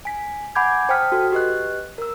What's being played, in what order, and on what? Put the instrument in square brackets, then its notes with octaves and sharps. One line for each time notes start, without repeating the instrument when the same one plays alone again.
[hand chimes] G#5 B6
F#5 G#5 B5 D6 G6 G#6
C5 G5 A5 D#6 F6 B6
F#4 A4
G4 B4 D#5 F#6
A#4 E6